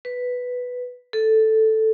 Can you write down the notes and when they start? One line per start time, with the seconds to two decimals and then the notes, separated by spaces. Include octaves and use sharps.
0.05 B4
1.13 A4